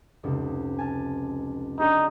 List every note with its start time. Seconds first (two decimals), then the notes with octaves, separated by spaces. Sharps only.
0.23 F1 C#2 C3
0.78 G#5 A5 F6
1.79 D4 D#4 F#4 G#4